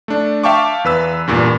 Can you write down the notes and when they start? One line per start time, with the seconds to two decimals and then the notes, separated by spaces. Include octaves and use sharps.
0.08 A3 D4
0.43 E5 F5 G5 A5 C#6 D6
0.84 E2 B4 E6
1.28 E2 G2 A#2